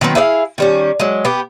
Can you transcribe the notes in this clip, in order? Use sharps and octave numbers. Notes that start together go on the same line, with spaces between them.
D#3 F#3 B3 C4
E4 G#4 D5 F5
D#3 G3 C#4
F#3 G#3
B3 G4